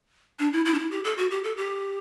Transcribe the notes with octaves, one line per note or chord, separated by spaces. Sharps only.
D4
E4
E4
D4
E4
G4
A4
F#4
G4
A4
G4